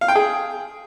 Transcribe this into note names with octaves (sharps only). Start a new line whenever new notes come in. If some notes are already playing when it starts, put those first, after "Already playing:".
F5
G5
G#4